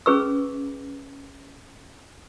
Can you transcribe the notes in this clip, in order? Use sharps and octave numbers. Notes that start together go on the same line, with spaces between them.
C#4 G#4 B4 C#6 E6